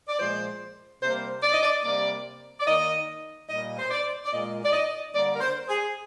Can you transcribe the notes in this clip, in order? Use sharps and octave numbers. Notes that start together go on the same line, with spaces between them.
D5
A#2 F3 G#3 C5
C3 G3 A#3 C5
D5
D#5
D5
C3 G3 A#3 D5
D5
D#3 A#3 D#5
A#2 G3 A#3 D#5
C5
D5
D5
A#2 G#3 D#5
D5
D#5
D3 G3 A#3 D5
A#4
C5
G#4